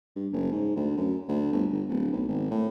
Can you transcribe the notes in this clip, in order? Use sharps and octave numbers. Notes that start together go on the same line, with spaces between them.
G2
F#1
G#2
D2
F#2
D2
G1
G1
D1
B1
G#1
A2